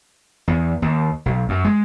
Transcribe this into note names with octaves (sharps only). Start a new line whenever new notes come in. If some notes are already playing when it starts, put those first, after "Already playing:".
E2
D#2
B1
F#2
G#3